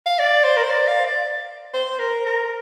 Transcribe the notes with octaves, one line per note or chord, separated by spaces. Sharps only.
F5
D5
C5
A#4
C5
D5
F5
D5
C5
A#4
A#4